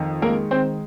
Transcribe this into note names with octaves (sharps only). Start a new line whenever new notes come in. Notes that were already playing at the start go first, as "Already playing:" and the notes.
Already playing: F2 D#3
G#3 A#3 A#4
D#3 C4 C5